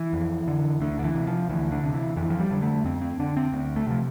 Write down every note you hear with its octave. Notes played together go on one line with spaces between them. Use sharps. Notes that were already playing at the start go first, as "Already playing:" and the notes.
Already playing: E3
F2
D3
D2 D3
D3
E3
C3
F3
D2 E3
D3
C3
E3
F2 E3
F3
G3
D3
A3
F2 C4
C4
D3 D4
C4
D2
A3
C3 F3